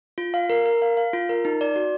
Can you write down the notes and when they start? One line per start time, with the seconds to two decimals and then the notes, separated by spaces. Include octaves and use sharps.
0.18 F4
0.34 F5
0.50 A#4
0.66 A#4
0.82 F5
0.97 F5
1.13 F4
1.29 A#4
1.45 D#4
1.61 D5
1.76 F#4